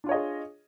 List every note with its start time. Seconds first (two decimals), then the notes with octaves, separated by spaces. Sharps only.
0.04 D4
0.06 F4
0.09 C#5
0.11 D#5
0.14 G#4